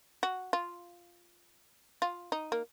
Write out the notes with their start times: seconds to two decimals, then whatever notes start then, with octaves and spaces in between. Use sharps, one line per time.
0.23 F#4
0.53 F4
2.02 F4
2.32 D#4
2.52 A#3